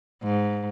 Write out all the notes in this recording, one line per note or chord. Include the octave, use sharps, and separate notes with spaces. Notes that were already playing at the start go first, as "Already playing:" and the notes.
G#2